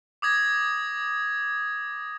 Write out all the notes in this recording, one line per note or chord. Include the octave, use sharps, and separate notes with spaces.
D6 D#6 G#6 A#6